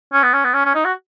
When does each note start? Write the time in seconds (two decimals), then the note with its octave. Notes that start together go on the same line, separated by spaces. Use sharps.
0.13 C#4
0.23 B3
0.33 C#4
0.44 B3
0.54 C#4
0.65 C#4
0.75 D#4
0.85 F#4